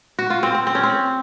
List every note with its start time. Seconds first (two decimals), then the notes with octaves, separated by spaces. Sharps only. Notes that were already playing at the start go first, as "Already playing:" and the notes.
0.19 F#4
0.30 F4
0.43 C4
0.55 C4
0.67 C4
0.75 C#4
0.83 C4